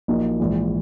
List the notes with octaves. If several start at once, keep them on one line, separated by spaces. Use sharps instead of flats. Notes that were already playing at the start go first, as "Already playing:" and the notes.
A#1 A#2 F#3 A#3 D#4
A#1 G#2 E3